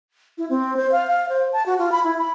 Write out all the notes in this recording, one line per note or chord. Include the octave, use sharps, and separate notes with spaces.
E4
C4
C5
F5
F5
C5
A5
F#4
F4
B5
E4
B5